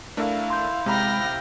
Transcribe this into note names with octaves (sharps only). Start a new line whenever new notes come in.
A3 D4 E4 A#4 F5
C6 G6
C3 G#3 G5 A#5 B5 F6 A#6